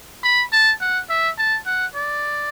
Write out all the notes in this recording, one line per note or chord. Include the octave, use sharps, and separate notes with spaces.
B5
A5
F#5
E5
A5
F#5
D5